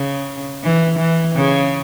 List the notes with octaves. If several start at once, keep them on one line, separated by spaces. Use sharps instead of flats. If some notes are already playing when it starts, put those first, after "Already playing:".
Already playing: C#3
E3
E3
C#3